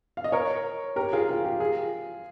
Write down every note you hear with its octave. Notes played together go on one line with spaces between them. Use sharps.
F5
D#5
A#4 C#5
G4 A#4
F4 G#4
F4
G4
F4 G#4